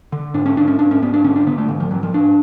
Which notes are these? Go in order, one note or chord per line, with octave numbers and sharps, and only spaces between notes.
D3
G#2 D4
C#4
G#2 D4
C#4
G#2 D4
C#4
G#2 B3
D4
D3 C#4
D4
D3 B3
A3
G#2 D3
F3
G#2 F#3
F3
G#2 D4